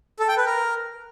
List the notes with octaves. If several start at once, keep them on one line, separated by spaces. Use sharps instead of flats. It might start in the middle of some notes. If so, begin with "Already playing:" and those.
A4
G5
B4
A#4